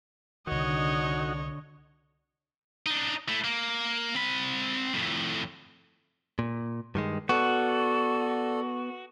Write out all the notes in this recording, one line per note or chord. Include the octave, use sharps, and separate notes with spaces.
C2 D3 D#3 D#4 F#4 C#5 D#5
D4 D#4
A3 E4
A#3
C4 B5
F2 A2
A#2
G2 D#3 G#3
B3 F#4 A4 D5